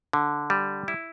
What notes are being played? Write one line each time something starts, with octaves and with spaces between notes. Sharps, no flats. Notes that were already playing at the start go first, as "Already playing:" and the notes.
D3
G3
E4